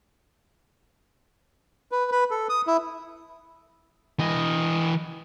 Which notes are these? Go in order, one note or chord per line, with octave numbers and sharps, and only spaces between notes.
B4
B4
A4
D#6
E4
E3 D#5